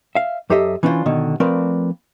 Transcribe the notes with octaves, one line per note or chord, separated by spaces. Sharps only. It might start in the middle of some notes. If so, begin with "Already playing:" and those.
E5 F5
F#2 G4 A4 C5 D#5 E5
E3 C#4 D4 E4 F4 C5
B2 D3 D#3
F3 A3 C4 A#4 B4 D5